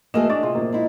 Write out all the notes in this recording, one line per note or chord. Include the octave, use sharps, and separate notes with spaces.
B2 E3 A3 A#3 G#4 D#5 E7
D4 C#6 D6 A6
C3 F4 G#4
A#2 F3 A#3
G#3 D#4 E4